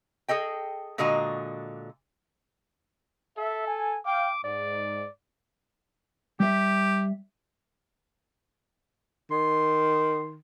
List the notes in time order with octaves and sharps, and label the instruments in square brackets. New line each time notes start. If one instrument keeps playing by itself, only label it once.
[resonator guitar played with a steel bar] G#4 A4 D#5 G5
A#2 D3 G#3 F#4 D#5 A#5
[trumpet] A4 [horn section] E5
[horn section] G#5
[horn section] F5 G5 [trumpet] D6
[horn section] G#2 [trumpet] D5
[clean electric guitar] G3 E5 [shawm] G4
[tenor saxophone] D#3 [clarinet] C6